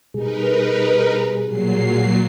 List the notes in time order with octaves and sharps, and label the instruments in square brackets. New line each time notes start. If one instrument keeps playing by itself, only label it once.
[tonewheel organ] B2 G3 G#4 [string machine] D#4 A#4 B4
[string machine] A#2 F#3 C7